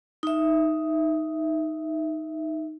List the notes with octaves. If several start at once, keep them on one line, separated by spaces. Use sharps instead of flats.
D#4 E5